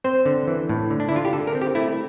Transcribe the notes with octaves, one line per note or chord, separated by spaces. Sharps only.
C4 C5
D3
E3
A2
D3
D4
E4
D3 F4
G4
D3 A4
A#4
C4
G4
A3 E4